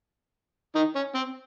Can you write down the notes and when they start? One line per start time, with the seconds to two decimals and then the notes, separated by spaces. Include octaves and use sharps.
0.75 D#3 D#4
0.95 C#4
1.15 C4